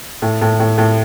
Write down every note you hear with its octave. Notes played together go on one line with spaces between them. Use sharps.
A2
A2
A2
A2